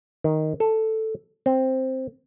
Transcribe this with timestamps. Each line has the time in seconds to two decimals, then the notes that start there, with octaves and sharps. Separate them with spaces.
0.24 D#3
0.60 A4
1.46 C4